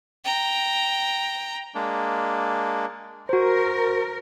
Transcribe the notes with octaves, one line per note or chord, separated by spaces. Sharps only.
G5 A#5
G#3 A#3 D4
F#4 A#4 C5